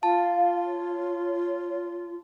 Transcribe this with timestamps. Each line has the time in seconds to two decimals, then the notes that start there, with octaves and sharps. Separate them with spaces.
0.03 F4 F5 A5
0.66 C#5